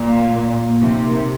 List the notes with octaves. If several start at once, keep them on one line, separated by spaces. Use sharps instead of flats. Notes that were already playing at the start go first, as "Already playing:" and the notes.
Already playing: A#2
F5
A#3
A#3
C3 D#4
A#4